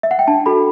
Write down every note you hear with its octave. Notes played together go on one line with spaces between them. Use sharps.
E5
F#5
G5
D4 A5
F#4 A4 B5